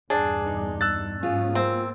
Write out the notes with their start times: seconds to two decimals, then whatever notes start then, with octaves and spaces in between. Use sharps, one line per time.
0.10 E2 G2 A#2 D4 G#4
0.46 D#4
0.81 E6 F#6 A6
1.22 G#2 F#3 B3 C#4 F4 G#4
1.55 A#3 C4